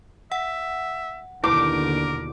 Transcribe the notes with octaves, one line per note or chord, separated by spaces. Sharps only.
E5 F#5
D#2 B2 D3 E4 A#4 D6